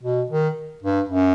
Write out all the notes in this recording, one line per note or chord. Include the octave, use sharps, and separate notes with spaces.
B2
D#3
G2
F#2